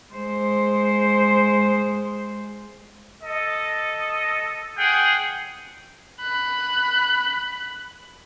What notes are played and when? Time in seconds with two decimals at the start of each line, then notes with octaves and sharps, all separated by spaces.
0.11 G#3 C5
3.23 A4 D#5
4.77 G#4 F#5 G5
6.21 B5 F#6